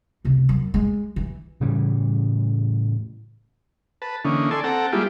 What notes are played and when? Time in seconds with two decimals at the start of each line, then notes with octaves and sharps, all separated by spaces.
0.25 C#2 C3
0.49 F#2
0.74 G#3
1.16 E3
1.61 A2 C#3 E3 G3
4.02 B4 A5
4.25 D3 E3 A#3 C#4 D#4
4.51 A4 D5 G#5 A5 C6 E6
4.64 C4 A4 F#5 G5 A5 A#5
4.92 G3 G#3 A#3 E4 F4 G4